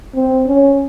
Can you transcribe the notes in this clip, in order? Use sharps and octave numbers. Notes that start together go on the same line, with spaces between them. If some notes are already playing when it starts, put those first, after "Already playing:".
C4
C#4